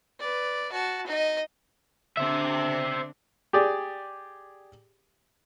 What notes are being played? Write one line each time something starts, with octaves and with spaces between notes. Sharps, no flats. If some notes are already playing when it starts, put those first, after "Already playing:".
B4 D5
F#4 A5
D#4 D#5
D3 C4 D4 C5 E5
G4 G#4 D5